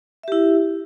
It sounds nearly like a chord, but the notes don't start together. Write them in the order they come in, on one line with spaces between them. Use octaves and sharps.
E5 G4 E4